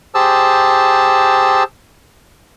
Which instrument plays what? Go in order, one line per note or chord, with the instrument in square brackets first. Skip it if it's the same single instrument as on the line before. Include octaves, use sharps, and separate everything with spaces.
[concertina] G4 G#4 C5 A5 E6